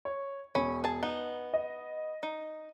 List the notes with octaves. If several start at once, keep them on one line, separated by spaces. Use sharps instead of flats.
C#5
E1 C#4 B5
G#4 A5
B3 D#4 G7
D#5
D#4